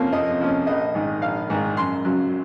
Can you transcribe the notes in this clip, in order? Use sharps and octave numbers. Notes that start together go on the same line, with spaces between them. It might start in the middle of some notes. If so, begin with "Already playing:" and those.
Already playing: F2 C3 F3 A#3 C#4
F2 D#5
C3 F3 A#3 C#4
A#1 D#5
G#2 D#3
A#1 F5
G#2 D#3
F#2 C6
C#3 F#3